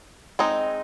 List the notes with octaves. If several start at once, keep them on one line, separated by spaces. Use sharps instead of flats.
G#3 C4 D#4